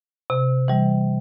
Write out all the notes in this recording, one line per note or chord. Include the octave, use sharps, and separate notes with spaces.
C3
E3 G3